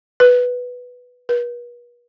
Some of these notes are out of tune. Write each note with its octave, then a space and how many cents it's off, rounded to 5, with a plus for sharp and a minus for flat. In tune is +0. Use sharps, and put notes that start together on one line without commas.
B4 +0
B4 -45